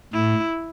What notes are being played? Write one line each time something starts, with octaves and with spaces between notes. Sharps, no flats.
A2 E4